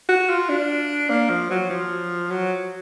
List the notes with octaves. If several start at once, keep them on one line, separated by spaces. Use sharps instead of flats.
F#4
F4
D4
A#3
F3
F#3
F3
F#3